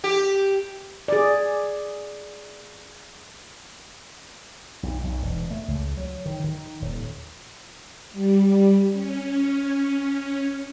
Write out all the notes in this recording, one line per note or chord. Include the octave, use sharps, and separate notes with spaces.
G4
G#4 D5
B1
B1
E1
A3
C#2
F#3
D#3
D#3
D#1
G3
C#4